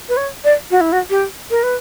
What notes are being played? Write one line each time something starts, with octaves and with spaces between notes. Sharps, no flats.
B4
C#5
D5
F#4
E4
F#4
G4
A#4
B4